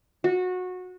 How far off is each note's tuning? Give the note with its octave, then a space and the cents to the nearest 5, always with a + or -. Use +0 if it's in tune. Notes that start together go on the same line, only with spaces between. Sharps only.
F#4 -20